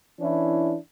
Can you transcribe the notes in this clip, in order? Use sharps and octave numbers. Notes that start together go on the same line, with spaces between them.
E3 C#4 D4 E4